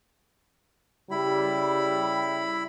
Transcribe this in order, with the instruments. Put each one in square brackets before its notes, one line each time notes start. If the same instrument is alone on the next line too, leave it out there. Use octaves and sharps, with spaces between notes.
[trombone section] C#3 G3 [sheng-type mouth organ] E4 B5